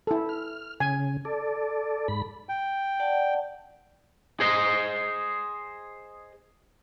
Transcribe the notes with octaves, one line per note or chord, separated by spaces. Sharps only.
E4 A4
F6
C#3 G#5
A4 D5
G#2 B5
G5
D5 F#5 A5
G#4 C5 D#5